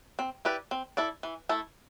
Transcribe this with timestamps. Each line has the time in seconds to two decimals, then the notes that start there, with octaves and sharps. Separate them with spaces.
0.19 C4
0.45 E4 G4 B4 D5
0.71 C4
0.97 E4 A4 D5
1.23 E3
1.49 A3 E4 A4